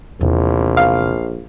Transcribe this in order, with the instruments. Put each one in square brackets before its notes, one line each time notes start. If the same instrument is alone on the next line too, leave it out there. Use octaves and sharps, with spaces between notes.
[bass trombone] A#1 [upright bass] E2 C3
[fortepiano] F5